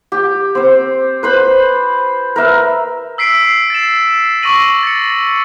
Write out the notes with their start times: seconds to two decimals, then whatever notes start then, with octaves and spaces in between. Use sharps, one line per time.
0.12 G4
0.55 C4 C5
1.23 B4 C5 B5
2.36 A#4 B4 E5
3.18 E6 B6 C7 D7
3.70 A6 E7
4.43 C#6 D6 E6 A#6 D#7 F#7
4.83 A6 C#7